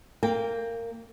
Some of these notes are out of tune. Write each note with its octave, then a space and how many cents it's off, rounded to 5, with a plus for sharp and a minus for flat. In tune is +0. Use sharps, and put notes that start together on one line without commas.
A#3 -15 G5 +20